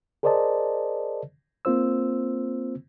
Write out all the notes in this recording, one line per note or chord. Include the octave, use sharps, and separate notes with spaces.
G#4 A#4 C5 D5 D#5 A5
A#3 C4 F4 C5 E6